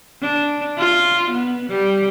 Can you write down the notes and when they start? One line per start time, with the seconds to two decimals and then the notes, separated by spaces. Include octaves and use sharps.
0.22 D4
0.78 F4
1.31 B3
1.70 G3